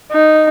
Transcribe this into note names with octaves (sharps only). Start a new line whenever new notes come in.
D#4